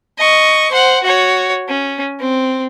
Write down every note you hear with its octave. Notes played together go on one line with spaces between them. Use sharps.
D#5 C#6
C5 F#5
F#4 C#5
C#4
C4